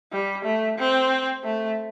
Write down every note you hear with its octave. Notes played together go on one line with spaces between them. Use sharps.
G3
A3
C4
A3